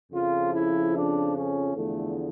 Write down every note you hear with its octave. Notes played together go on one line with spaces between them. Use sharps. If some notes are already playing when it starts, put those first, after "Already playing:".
F2 C#3 F3 F4
E4
D4
C#4
E2 D3 F3 A3